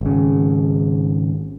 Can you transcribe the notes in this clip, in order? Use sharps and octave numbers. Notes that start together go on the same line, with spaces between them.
G#1 C#3